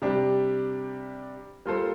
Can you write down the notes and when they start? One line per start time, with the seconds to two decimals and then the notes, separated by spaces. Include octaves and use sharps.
0.02 C3 G3 D4 G4
1.66 G3 A#3 F4 A4 C5